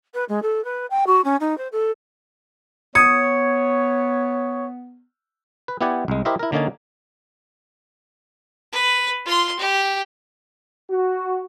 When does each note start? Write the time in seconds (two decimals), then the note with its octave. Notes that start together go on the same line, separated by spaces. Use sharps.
0.14 B4
0.28 G#3
0.42 A4
0.64 B4
0.90 G5
1.07 F#4
1.24 C#4
1.40 D#4
1.57 C5
1.72 A4
2.95 B3 C#5 D#6 G#6 C#7
5.68 B4
5.81 B3 E4 G4 D5 F#5 G#5
6.08 C2 G#3
6.25 E4 G4 A#4 C5 D#5 E5
6.39 E4 A#4
6.52 D3 A#3 C#4 D#4 G#5 A5
8.73 B4
9.26 F4 C6
9.59 G4
10.90 F#4